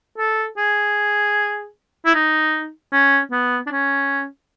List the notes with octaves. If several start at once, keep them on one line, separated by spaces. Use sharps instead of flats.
A4
G#4
E4
D#4
C#4
B3
D4
C#4